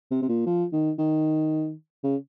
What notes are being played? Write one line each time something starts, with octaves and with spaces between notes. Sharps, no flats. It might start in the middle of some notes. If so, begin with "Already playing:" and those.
C3
C3
A#2
F3
D#3
D#3
C#3